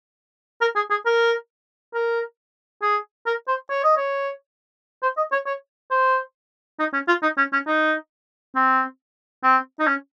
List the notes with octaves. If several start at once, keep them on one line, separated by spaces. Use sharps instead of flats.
A#4
G#4
G#4
A#4
A#4
G#4
A#4
C5
C#5
D#5
C#5
C5
D#5
C#5
C#5
C5
D#4
C#4
F4
D#4
C#4
C#4
D#4
C4
C4
D#4
C#4